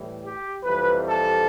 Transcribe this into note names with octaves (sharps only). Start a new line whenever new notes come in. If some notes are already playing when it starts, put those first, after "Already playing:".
Already playing: A2 E3 G3
G4
F2 C3 E3 G3 B4
A4